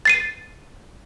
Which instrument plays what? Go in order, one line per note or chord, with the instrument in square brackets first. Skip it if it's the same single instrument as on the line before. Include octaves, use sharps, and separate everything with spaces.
[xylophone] A6 C7 D#7